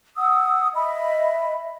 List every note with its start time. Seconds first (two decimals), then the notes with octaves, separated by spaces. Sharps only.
0.16 F#5 D#6 E6
0.74 D#5 E5 B5